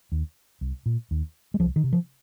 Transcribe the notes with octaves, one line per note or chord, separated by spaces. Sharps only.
D#2
C2
A#2
D#2
G#3
C2 F3
D#3
C3
F3